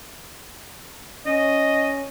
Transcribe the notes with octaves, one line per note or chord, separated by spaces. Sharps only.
C#4 D#5